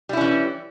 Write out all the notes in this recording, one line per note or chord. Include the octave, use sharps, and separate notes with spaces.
E3 G3 C#4 E4